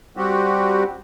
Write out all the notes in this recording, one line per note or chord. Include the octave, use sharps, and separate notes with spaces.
G3 C4 F#4 G4